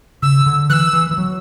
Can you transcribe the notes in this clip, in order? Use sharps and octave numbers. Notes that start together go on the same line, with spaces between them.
C#3 E6
D3
E3 E6 F#6
E3
E3
F#3